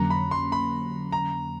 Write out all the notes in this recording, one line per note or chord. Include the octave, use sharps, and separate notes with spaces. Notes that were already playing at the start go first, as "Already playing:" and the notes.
Already playing: F2 D3 F#3 A#3 C#4 A#5
B5
C6
B5
A#5